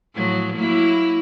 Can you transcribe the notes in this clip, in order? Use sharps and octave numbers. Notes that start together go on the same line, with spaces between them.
A2 F3 F#3
F#3 A#3 E4